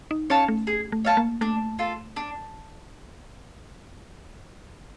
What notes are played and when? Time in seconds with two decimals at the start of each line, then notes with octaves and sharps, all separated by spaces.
0.11 D#4
0.30 C#4 C#5 F5 A5
0.48 A3
0.67 G#4
0.92 A3
1.05 C#5 F5 A5
1.17 A#3
1.41 A3 D4
1.79 F4 A4
2.16 D4